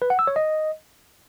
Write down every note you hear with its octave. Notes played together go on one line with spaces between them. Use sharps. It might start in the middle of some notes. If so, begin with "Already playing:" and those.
B4
F#5
E6
C#5
D#5